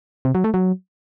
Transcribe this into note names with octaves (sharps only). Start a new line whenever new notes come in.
C3
F#3
A3
F#3